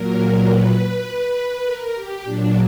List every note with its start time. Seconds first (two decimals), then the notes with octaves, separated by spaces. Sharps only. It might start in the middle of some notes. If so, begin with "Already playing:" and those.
Already playing: A#2 F#3 A#4
0.46 B4
1.64 A#4
1.94 G4
2.24 A#2 F#3 D4